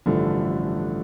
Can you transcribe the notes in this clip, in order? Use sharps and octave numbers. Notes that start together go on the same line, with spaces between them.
A1 G2 D3 F3 A3